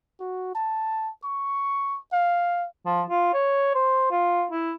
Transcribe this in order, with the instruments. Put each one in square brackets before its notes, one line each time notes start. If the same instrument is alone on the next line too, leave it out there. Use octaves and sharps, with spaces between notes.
[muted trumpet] F#4
A5
C#6
F5
[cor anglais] F3
F4
C#5
C5
F4
E4